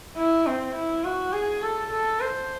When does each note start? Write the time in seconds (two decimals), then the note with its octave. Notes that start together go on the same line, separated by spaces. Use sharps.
0.17 E4
0.46 C4
0.75 E4
1.04 F#4
1.32 G#4
1.62 A4
1.91 A4
2.20 C5